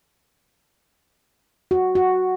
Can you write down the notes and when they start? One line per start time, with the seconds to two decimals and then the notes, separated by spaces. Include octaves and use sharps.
1.71 F#4
1.95 F#4